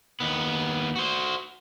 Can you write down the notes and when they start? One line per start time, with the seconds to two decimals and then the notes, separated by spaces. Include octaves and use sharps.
0.20 D#2 B3
0.96 F#4 C5